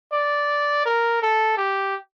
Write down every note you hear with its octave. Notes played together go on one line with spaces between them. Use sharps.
D5
A#4
A4
G4